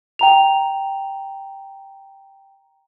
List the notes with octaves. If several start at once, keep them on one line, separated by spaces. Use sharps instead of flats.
G5 A#5 F7